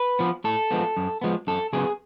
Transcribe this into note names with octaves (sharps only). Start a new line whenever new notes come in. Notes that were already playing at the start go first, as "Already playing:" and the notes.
Already playing: B4
F3 B3
A2 A4
F3 G#3 B3
F#2
F3 G#3 B3
F#2 A4
C#3 F#3 B3 G#4